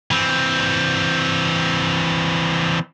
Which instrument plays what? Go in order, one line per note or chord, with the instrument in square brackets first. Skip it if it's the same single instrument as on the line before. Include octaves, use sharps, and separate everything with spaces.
[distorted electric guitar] E3 C4